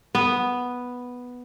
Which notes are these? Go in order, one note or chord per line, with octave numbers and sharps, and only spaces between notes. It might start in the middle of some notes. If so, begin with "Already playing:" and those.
B3